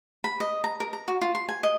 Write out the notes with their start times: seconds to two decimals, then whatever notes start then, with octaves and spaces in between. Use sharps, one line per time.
0.24 B5
0.40 D#5
0.64 A#5
0.80 A#4
0.93 A#5
1.08 F#4
1.21 F4
1.35 C6
1.49 G#5
1.63 D#5